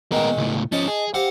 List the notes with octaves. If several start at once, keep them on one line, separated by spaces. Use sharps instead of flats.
A#2 D#3 G#3 B3 A#4
C#2 A2
F3 C#4 D#5 A5
G#4
C4 G4 F5 F#5